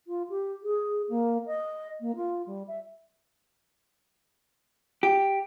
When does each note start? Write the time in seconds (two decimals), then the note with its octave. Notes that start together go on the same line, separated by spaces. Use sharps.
0.07 F4
0.29 G4
0.63 G#4
1.09 A#3
1.46 D#5
2.00 A#3
2.15 F4
2.46 G3
2.67 E5
5.03 G4